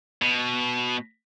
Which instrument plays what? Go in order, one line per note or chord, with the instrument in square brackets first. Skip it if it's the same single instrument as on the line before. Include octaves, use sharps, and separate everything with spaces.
[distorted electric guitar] B2